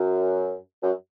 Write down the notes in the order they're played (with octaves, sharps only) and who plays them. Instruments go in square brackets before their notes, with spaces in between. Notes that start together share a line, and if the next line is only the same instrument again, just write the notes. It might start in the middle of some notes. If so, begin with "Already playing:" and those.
Already playing: [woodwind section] F#2
F#2